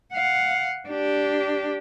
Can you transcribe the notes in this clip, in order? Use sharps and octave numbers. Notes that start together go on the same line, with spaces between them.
F5 F#5
D4 G4